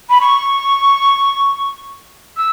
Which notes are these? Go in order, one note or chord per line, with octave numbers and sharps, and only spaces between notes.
B5
C#6
E6